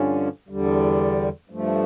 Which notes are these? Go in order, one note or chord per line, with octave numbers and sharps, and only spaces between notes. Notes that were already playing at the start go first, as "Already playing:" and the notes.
Already playing: G2 D3 F3 C#4
E2 D3 G3
G2 F3 A3